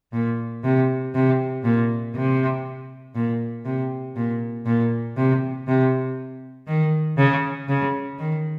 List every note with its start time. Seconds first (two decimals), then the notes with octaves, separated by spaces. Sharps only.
0.13 A#2
0.64 C3
1.15 C3
1.64 A#2
2.15 C3
3.15 A#2
3.65 C3
4.16 A#2
4.66 A#2
5.17 C3
5.68 C3
6.67 D#3
7.18 C#3
7.68 C#3
8.19 D#3